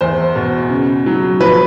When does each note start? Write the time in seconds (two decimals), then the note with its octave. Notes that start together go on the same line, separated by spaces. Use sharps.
0.01 E2 C5
0.35 B2
0.70 C#3
1.06 F#3
1.40 F3 B4